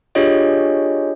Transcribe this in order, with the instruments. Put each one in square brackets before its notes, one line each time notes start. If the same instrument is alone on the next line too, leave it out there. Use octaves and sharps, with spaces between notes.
[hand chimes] D4 F4 G4 G#4 C#5 D#5